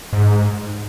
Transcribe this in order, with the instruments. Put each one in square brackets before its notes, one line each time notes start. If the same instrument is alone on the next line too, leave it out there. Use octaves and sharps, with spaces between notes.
[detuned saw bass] G#2